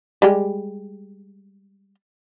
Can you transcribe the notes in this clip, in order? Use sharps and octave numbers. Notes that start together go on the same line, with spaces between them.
G3 G#3 G4